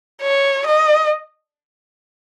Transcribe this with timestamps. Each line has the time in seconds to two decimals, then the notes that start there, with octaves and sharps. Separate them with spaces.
0.22 C#5
0.66 D#5